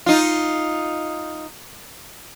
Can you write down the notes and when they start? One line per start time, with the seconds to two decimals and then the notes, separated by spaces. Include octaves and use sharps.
0.06 D#4 F4